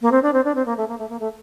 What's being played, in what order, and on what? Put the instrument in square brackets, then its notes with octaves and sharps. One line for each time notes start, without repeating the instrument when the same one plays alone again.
[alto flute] A#3
C4
D4
C4
D4
C4
A#3
A3
A#3
A3
A#3
A3